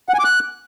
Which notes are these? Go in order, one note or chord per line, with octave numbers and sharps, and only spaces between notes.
F#5
G#5
D6
F#6